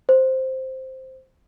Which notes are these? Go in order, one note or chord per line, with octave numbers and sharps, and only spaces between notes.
C5